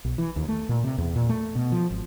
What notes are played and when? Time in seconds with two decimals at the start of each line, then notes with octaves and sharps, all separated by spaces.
0.05 B1
0.18 E3
0.36 D#2
0.48 A3
0.69 A#2
0.84 C3
0.98 E2
1.16 A#2
1.29 A3
1.55 B2
1.72 F3
1.91 G#1